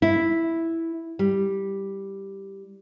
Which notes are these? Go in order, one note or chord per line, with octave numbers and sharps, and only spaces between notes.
E4
G3